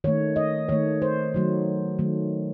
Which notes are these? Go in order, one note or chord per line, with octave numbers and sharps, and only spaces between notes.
D#3 A3 C#5
D#5
D#3 A3 C#5
C5
D#3 F#3 A3
D#3 F#3 A3